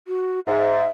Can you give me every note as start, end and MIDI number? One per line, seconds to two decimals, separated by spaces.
0.08 0.40 66
0.47 0.83 44
0.47 0.87 76